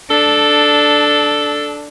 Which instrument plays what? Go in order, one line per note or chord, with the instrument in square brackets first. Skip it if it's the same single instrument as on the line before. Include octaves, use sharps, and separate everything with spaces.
[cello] D4 [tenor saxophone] A4